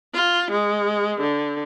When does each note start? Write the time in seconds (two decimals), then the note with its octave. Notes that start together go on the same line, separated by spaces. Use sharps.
0.14 F4
0.51 G#3
1.21 D3